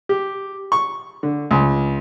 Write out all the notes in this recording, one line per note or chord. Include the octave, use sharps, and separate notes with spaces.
G4
C#6
D3
C#2